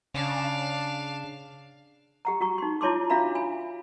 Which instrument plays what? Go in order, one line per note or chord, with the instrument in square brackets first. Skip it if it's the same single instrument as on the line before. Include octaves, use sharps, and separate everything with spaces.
[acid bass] C#3 [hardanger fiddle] D4 F5
[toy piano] G4 F#5 A#5
F#4 F#5 A#5 C#6
D#4 C6
E4 F4 C#5 A5 C6 D6
D4 F#4 E5 F5 A#5 B5
G#5 B5